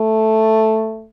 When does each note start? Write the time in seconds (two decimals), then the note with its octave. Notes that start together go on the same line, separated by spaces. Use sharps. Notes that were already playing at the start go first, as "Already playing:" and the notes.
Already playing: A3